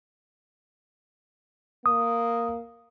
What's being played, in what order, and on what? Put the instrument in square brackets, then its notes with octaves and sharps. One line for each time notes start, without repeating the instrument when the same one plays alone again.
[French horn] A#3 [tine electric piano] D#6